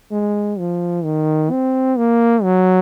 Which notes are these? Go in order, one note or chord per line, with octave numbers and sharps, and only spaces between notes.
G#3
F3
D#3
C4
A#3
F#3